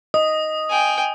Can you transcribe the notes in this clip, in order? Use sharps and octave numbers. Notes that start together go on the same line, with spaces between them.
D#5 D#6
G5 G#5